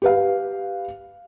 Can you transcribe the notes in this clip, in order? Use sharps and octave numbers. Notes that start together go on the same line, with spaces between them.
G4 B4 F5